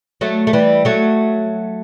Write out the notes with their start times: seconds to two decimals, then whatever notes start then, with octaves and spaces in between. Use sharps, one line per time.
0.21 F#3 A3
0.47 A3
0.53 E3 G3
0.85 F#3 A3